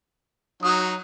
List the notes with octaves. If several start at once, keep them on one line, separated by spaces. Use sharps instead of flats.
F#3 D#4 F#4 D#6